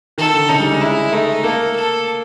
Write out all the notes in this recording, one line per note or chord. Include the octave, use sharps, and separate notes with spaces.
D#3 A4
D3
C#3 D#4
G3
G#3
G#3 E4
A3 D#4
A#3 A4
A4